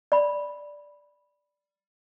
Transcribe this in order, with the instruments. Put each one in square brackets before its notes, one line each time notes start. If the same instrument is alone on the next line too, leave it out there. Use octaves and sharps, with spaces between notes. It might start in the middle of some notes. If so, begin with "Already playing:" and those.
[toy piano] D5 B5